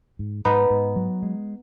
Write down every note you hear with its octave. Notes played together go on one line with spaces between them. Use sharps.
G#2
G#2 B3 D#4
G#2
F#3
G#3